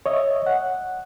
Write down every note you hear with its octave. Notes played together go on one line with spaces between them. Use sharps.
C#5 D#5 E5
F#5